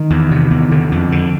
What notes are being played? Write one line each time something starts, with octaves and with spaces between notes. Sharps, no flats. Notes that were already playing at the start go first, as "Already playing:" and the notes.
Already playing: D#3
E2
C3
E2
D3
F2
D3